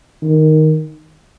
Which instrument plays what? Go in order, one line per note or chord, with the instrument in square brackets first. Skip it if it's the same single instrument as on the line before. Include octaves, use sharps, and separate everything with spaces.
[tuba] D#3